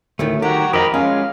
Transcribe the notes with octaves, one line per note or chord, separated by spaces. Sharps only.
D2 A2 D#3 A3
D#3 F#4 G4 A#5
F2 G4 A#4 D#5 A#5 B5 D#6
G#3 C#4 F4 F5